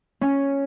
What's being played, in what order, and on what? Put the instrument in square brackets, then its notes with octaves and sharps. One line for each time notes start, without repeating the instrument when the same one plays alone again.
[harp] C#4